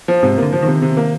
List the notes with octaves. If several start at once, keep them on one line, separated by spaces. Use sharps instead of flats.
F3
G#2 C3
D3 A#3
F3
C3 D#3
C3
A#3